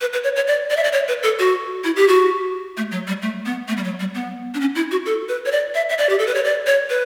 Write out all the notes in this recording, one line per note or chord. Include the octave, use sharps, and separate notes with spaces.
B4
B4
C#5
C#5
D5
D5
E5
D5
C#5
B4
A4
F#4
E4
G4
F#4
A3
F#3
G3
A3
B3
A3
G3
F#3
G3
B3
D4
C#4
E4
F#4
A4
B4
C#5
D5
E5
E5
D5
G4
A4
B4
C#5
D5
C#5
B4